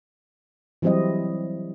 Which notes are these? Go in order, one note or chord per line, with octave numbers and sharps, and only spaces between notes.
E3 F#3 G3 C4 E4 D#5